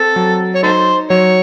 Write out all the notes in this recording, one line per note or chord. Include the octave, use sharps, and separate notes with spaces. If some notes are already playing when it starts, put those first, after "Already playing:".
Already playing: C4 A4
F#3
C#5
D#4 A4 C5
F#3 C#5